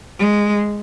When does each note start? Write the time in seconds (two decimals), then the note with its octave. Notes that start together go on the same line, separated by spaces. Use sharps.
0.19 G#3